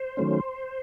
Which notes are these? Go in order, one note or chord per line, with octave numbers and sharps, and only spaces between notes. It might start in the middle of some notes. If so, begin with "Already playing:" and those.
Already playing: C5
D#3 F#3 A3 C#4